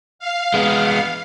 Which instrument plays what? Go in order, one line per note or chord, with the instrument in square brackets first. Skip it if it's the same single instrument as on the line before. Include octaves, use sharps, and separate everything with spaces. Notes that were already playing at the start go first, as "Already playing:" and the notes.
[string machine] F5
[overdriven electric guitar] G#3 B3